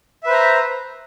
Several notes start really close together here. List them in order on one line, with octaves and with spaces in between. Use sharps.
E5 B4 C5 A#5